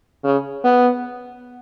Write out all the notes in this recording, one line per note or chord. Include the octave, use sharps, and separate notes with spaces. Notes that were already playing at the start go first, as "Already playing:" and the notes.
C#3
B3